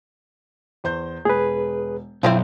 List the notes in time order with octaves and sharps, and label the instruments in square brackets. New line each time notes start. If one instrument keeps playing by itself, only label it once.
[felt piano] E2 C5 G6
[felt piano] E1 [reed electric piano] G#4 B4
[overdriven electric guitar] B1 [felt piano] F#2 C5 [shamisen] C4 E4 F4